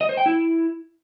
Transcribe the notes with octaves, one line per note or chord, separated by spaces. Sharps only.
D#5
C5
G5
E4